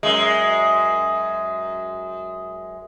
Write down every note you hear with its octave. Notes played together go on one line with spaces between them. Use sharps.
F#2 G#3